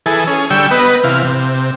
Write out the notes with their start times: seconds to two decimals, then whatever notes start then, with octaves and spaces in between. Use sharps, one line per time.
0.06 E3 G#4 A4
0.27 C#4 G#4
0.50 D3 G3 G5 C#6 E6
0.71 B3 B4 D#5
1.04 C3 E3 F5
1.24 C3